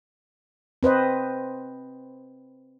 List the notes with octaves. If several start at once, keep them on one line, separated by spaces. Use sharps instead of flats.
C4 B4 C5 D#5